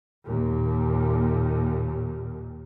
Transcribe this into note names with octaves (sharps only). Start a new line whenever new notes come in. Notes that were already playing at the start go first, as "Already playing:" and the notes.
D#2 A#2